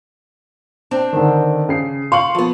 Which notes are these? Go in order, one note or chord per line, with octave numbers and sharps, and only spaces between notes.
C4 D4
D3 D#3
C#3 C7
F5 C6 C#6 F#7
F3 B3